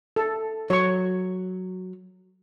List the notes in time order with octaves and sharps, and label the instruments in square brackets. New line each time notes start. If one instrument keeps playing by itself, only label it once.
[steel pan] A4
[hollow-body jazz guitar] F#3 [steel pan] C#5 C#6